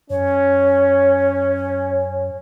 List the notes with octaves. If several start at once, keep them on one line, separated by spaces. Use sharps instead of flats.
F#2 C#4 C#5